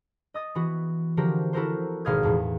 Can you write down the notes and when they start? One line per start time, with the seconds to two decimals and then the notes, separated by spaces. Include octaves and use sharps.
0.34 D#5 D#6 A6
0.55 E3 B3 F#4
1.17 D3 F3 C4 F#4 G4 A#4
1.53 E4 F#4 A4 A#4 C5
2.05 G#1 B2 F5 D#6 G#6
2.23 E2 A2 E3